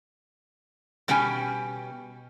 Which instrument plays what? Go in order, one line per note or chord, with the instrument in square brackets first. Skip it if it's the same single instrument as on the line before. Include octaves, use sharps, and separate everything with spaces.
[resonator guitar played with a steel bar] B2 G3 C#4 G5 G#5